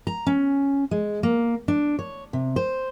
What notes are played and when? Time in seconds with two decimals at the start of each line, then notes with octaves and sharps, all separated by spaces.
0.07 A#5
0.27 C#4
0.91 G#3
1.23 A#3
1.68 D4
1.99 C#5
2.33 C3
2.56 C5